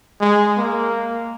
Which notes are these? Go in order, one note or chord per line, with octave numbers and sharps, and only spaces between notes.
G#3
A#3